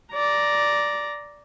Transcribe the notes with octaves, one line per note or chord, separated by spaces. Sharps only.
D5 A#5